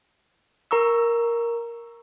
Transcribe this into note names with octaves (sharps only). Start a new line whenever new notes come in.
A#4 A#5 C#6 E6